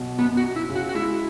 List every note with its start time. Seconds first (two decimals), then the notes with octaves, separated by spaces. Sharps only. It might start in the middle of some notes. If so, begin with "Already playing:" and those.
Already playing: B1 B2
0.18 F#2 B3
0.37 F#4
0.43 F#2
0.56 E4
0.69 C#3
0.76 F#4
0.89 F#4
0.95 G#3 E4